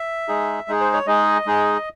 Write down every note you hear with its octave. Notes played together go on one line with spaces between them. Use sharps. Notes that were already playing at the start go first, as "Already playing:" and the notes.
Already playing: E5
G#3 D#4 G#4
G#3 D#4 G#4
C5
C#5
G#3 D#4 G#4 D#5
G#3 D#4 G#4